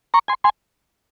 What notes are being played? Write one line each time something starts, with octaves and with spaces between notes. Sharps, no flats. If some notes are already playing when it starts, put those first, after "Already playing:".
A#5 C#6
G#5 C6
G#5 C6